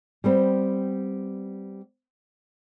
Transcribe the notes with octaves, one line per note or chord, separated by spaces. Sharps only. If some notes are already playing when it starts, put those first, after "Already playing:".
G3 B3 C4